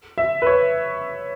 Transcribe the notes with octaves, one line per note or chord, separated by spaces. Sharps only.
E5
B4
C#5